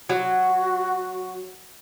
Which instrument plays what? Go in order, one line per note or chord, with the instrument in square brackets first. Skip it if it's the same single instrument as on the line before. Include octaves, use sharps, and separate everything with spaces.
[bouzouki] F#3 [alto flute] F#4